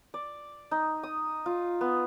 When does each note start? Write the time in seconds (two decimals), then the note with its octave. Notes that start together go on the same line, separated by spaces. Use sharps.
0.14 D5
0.71 D#4
1.03 D#6
1.46 F4
1.81 B3